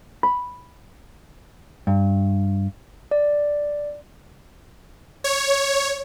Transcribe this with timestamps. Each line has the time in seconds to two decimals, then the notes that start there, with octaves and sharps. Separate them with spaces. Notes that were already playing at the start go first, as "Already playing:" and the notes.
0.23 B5
1.87 G2
3.11 D5
5.24 C#5